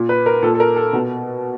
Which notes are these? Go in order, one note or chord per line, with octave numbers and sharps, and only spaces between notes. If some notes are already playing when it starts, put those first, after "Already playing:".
Already playing: A#2
B4
A#4
A#2 A4
A4
A#4
A4
B2